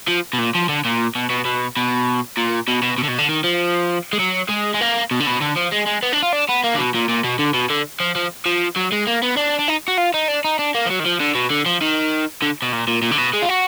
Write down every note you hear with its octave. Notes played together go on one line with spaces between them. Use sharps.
F3
B2
A#2
F3
D3
A#2
B2
B2
B2
B2
A#2
B2
B2
B2
D3
B2
D3
D#3
F3
G#3
F#3
G#3
G#3
A#3
B2
D3
B2
D3
F3
G#3
G#3
B3
D4
F4
D4
B3
A#3
D3
B2
A#2
A#2
B2
D3
B2
D3
F3
F3
F3
F#3
G#3
A#3
B3
D4
D4
D#4
F#4
F4
D#4
D4
D#4
D4
A#3
F3
F#3
D#3
F3
D3
B2
D3
F3
D#3
D3
B2
A#2
A#2
A#2
D3
B2
G#3
F4
F#4